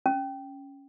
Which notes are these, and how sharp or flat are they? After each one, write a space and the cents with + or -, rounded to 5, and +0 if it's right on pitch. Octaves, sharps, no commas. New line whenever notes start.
C#4 +0